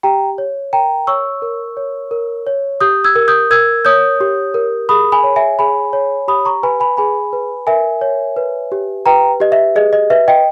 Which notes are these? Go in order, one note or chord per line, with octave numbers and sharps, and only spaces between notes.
G4 G5 A#5
C#5
A#4 G5 A#5
C#5 C#6 E6
A#4
C#5
A#4
C#5
G4 D#6 G6
E6 G#6
A#4
D#6 G6
A#4 E6 G#6
C#5 D#6 G6
G4
A#4
G#4 B5 D#6
G#5 B5
C#5
E5 G#5
G#4 G#5 B5
C#5
G4 B5 D#6
A#5 C#6
B4 G#5 B5
G#5 B5
G#4 G#5 B5
B4
A#4 E5 G#5
C#5
B4
G4
B4 G5 A#5
G4 D#5
E5
G#4 D#5
D#5
B4 E5
D#5 G5